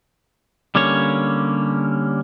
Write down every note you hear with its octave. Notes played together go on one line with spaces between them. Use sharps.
D3 G3 A#3 C#4 C#5